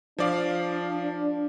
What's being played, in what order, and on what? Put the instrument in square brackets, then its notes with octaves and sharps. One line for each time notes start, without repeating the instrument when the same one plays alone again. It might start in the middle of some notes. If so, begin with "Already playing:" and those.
[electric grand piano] F3 D5 F5 [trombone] D4